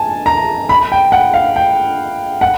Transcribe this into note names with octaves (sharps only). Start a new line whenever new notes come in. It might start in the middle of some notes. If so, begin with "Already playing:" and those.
Already playing: G#5 A5
A#5
B5
G5
F#5
F5
G5
F#5